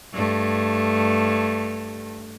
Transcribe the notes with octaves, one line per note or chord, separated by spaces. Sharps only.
G2 A3